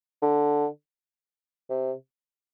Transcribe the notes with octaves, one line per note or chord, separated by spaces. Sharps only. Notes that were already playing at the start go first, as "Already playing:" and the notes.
D3
C3